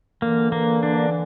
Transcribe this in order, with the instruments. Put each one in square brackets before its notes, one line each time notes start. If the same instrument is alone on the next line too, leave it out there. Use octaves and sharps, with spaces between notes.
[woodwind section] D3 E3 [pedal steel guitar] A#3
[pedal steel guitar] A#3
D4